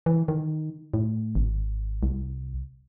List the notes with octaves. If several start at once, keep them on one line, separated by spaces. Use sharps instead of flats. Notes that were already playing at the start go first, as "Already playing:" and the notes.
E3
D#3
A2
G#1
C2